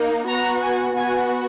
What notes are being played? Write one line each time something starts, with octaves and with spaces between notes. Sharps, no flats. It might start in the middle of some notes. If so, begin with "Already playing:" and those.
Already playing: A#3 D#4
B3 F#4 A#5
G#5
B3 F#4 G#5